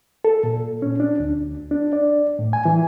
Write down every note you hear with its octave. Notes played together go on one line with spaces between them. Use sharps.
A4
A#2
C#4
D4
D2
D4
D5
A2
G#5
E3